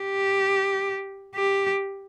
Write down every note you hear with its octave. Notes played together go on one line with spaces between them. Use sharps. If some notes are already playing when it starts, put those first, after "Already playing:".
Already playing: G4
G4